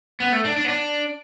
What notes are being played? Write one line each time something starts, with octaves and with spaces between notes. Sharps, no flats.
B3
A3
D4
D4
B3
D4